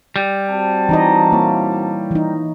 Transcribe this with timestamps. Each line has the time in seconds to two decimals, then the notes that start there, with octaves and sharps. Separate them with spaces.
0.16 G3
0.49 C4 F#4 A5
0.89 E3 D#4 B4 D5 D#5 A#5
1.32 A#3 E4 C#5
2.11 E3 D#4